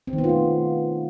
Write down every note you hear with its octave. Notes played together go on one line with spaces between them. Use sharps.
C4
D#3
B3
F4
A3